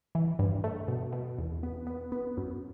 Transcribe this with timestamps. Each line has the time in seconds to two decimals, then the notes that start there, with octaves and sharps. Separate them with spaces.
0.15 E3
0.39 G2
0.64 A3
0.88 B2
1.13 B2
1.38 E2
1.63 B3
1.87 B3
2.12 B3
2.37 F#2